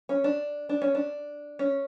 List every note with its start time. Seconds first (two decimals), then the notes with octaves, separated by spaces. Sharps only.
0.09 C#4
0.24 D4
0.69 D4
0.82 C#4
0.95 D4
1.59 C#4